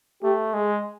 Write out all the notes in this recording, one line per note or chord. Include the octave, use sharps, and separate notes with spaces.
A3 G4
G#3 G#4